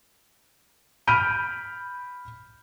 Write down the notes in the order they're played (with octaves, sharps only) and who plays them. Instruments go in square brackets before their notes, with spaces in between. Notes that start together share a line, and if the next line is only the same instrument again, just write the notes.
[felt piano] B5 F6 G6 D7 D#7